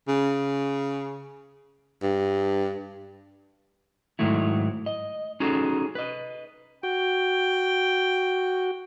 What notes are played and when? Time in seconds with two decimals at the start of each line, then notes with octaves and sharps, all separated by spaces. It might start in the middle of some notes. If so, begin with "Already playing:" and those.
0.08 C#3
2.02 G2
4.19 G#2 D#3 F#3 A3 E4
4.86 D#5
5.40 C#4 D#4 F#4 G#4 A4
5.95 B4 D#5
6.83 F#4 G5